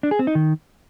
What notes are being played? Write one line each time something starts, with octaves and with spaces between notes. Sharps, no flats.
D4
G#4
C4
D#4
D#3